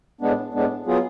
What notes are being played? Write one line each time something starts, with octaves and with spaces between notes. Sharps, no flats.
A2 G#3 B3 D4
A2 G#3 B3 D4
F#3 B3 F4 G#4